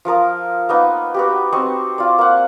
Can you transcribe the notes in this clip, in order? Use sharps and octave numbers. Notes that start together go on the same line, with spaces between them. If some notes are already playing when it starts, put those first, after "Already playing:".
F3 F4 A#4 D#6
A#3 B3 D#4
B3 F#4 G4
C4 D#5 C6 C#6
F4 D5
A#3 F#5